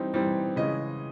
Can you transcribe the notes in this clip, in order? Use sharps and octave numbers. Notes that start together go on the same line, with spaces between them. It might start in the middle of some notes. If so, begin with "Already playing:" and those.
Already playing: E3 G3 C4 D#4
E3 G3 C4 D#4
C#3 E3 G#3 D#5